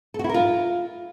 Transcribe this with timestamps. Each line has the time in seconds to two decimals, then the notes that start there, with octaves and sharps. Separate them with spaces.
0.14 A4
0.19 F#4
0.24 E4
0.29 A#4
0.34 F4